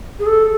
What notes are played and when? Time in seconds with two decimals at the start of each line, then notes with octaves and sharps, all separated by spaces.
0.19 G#4
0.26 A4